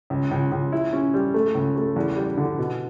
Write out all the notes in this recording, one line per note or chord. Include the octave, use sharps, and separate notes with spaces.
C#2
C#2
C#2
E4
C#4
G3
A3
C#2
A3
E2
G3
D3
B2